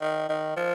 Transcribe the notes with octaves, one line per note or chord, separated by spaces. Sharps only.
D#3
D#3
F3